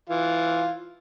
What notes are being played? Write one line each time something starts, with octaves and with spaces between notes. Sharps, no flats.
E3 F4